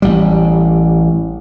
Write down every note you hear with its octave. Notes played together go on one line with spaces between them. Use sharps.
A1 G3